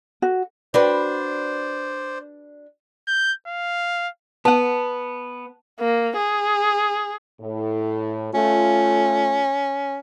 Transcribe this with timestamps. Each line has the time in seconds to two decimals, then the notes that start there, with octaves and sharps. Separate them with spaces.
0.22 F#4
0.74 D4 F#4 B4 C5 D5
3.07 G6
3.47 F5
4.45 B3 F#5 A5
5.80 A#3
6.16 G#4
7.41 A2
8.34 A3 C#4 F4